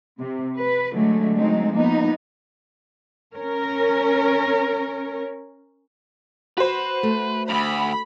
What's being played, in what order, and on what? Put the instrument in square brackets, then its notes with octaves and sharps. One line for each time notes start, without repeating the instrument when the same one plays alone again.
[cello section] C3
B4
D3 F#3 G#3 A3
F#3 G#3 A3 C4 D#4
F3 A#3 B3 D#4
C#4 A#4 C#5
[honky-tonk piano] F#4 C5 [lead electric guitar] B4
[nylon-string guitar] A3
[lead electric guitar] D2 G2 [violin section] B5